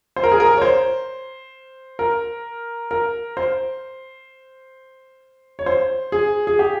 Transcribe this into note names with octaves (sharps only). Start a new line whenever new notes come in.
C5
A#4
G#4
A#4
C#5
C5
A#4
A#4
C5
C#5
C5
G#4
G#4
G4